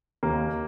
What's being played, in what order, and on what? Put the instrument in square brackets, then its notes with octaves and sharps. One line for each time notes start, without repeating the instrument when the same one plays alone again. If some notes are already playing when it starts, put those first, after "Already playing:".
[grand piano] D#2 A#3